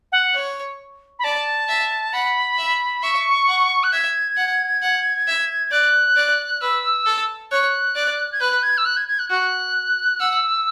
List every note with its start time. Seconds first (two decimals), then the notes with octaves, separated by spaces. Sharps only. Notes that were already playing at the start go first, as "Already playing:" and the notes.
0.12 F#5
0.34 C#5
1.19 B5
1.24 D5 A5
1.68 E5
2.13 F#5 B5
2.58 E5
3.03 E5 C#6
3.48 F#5
3.83 F#6
3.93 E5 G#6
4.37 F#5
4.82 F#5
5.27 E5
5.72 D5 F#6
6.16 D5
6.61 B4 E6
7.06 A4
7.51 C#5 F#6
7.95 D5
8.32 G#6
8.40 B4 F#6
8.63 G#6
8.78 E6
8.85 F#6
8.97 G#6
9.08 G#6
9.19 F#6
9.30 F#4 F#6
10.20 F#5 E6